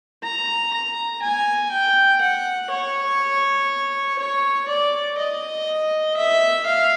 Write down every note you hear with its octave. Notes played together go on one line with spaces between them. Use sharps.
A#5
A#5
G#5
G5
F#5
C#5
C#5
D5
D#5
E5
F5